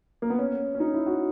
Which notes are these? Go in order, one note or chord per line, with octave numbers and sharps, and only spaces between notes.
A#3
B3
C#4
C#4
D#4
E4
F#4